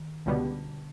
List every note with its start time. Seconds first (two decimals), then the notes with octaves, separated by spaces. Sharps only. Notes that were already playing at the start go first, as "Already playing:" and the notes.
Already playing: D#3
0.26 C#2 B2 D3 G3 B3